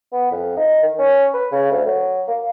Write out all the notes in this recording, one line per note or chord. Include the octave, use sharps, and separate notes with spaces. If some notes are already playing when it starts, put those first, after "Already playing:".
B3
F2
D#4
D#3
C#4
B4
C#3
D2
F#3
A#3